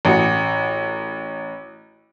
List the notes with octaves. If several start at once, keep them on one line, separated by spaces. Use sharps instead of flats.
A1 F#4 C#7